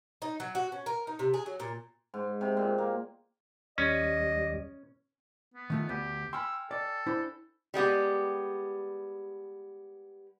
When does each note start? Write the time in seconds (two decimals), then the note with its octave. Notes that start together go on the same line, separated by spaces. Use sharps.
0.22 D#4
0.40 F#3
0.55 F#4
0.72 C#4
0.86 A#4
1.07 D#4
1.19 C3
1.34 G#4
1.46 F#3
1.60 A#2
2.14 G#2
2.41 C3
2.57 A#2
2.78 A#3
3.78 D#2 G3 C#4 D5 D#5
5.54 B3
5.70 D#3 A3 F4
5.89 D2 B3 G4
6.33 G5 G#5 B5 C6 E6 F6
6.71 A4 D5
7.06 D4 E4 C5
7.74 G3 G#3 B3 G4